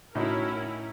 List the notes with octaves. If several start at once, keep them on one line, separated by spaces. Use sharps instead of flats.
A2 C#4 D#4 E4 F#4 A#4